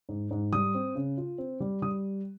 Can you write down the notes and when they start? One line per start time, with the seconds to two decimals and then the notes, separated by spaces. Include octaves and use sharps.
0.09 G#2
0.31 G#2
0.53 G3 D#6
0.75 C4
0.95 C#3
1.18 F4
1.38 C4
1.60 G3
1.82 G3 D#6